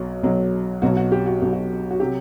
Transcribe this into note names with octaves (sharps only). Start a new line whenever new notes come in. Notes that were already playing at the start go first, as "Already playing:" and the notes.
Already playing: B1 B2 F#3
B1 B2 F#3
B1 B2 F#3 F#4
F#4
G4
F#4
B1 B2 F#3
F#4
F#4
C3 F#3 G4